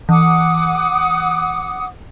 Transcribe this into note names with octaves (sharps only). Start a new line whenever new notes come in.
E3 F#5 D6 D#6